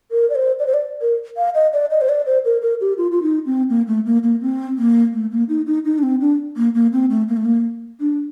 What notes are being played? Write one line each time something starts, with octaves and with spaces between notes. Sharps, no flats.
A#4
D5
C5
D5
C5
D5
A#4
F5
D#5
D5
D#5
C5
D5
C5
A#4
A#4
G4
F4
F4
D#4
C4
A#3
A3
A#3
A#3
C4
A#3
A3
A#3
D#4
D#4
D#4
D4
C4
D4
A#3
A#3
C4
A3
A#3
A3
A#3
D4